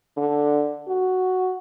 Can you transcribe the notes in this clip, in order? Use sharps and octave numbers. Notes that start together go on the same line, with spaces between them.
D3
F#4